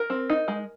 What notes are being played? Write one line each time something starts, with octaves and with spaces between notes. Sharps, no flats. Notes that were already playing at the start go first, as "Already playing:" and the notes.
Already playing: A#4
C4
D#4
G#3